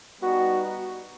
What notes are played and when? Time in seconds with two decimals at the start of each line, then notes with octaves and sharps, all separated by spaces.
0.21 G3 B3 D#4 F#4